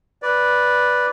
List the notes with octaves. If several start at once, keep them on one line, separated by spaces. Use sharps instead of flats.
B4 D5